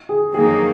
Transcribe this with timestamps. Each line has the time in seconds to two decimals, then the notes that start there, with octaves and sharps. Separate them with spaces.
0.09 G#4
0.34 F2 D#3 F#3 A#3 D#4 G#4